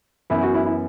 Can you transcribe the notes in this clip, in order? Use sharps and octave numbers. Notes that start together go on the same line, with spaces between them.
F#2 E3 B3 E4
F#4
E4
E4